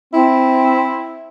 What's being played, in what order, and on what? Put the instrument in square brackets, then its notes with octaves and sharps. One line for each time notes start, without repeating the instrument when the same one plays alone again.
[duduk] C4 [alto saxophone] E4